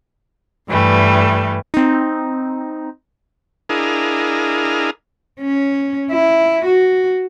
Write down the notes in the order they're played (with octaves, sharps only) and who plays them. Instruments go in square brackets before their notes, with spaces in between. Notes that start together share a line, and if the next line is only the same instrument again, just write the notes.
[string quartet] G2 E3 G3 A3
[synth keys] C4 D#4
[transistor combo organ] D4 E4 G#4 A#4 D#5 F5
[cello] C#4
E4
F#4